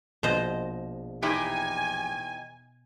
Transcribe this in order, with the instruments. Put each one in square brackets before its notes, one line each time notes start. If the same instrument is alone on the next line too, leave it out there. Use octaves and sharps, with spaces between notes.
[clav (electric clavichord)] A#1 [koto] B2 C5 D#5
[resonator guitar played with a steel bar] E2 D#4 G4 [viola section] G#5